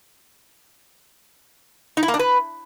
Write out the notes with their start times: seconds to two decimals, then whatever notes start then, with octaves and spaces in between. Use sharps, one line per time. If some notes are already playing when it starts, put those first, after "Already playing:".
1.97 D#4
2.03 E4
2.08 A#3
2.14 D4
2.19 B4